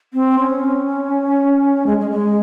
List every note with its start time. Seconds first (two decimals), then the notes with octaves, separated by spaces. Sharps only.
0.13 C4
0.39 C#4
1.86 G#3
2.01 G#3
2.11 G#3